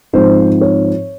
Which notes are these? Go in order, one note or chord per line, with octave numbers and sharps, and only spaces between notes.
G#2 F3 C4 D#4 C5
C#5